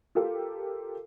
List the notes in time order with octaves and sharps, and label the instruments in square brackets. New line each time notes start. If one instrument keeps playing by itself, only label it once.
[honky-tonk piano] F4 G4 A4 A#4